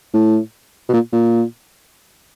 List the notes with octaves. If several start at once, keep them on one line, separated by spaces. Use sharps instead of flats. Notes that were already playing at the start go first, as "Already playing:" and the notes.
A2
B2
A#2
A#2